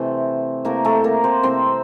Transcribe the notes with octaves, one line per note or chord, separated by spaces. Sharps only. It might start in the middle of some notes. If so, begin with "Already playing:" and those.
Already playing: C3 E3 A3 C4 C5
C3 E3 A3 A#3 A#4
A3 A4
A#3 A#4
C4 C5
C3 E3 A3 C4 C5